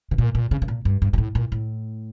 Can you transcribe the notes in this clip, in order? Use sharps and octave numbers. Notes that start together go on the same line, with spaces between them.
C#3
A#2
A#2
C#3
C#3
A#2
G2
G2
A#2
A2
A#2
A2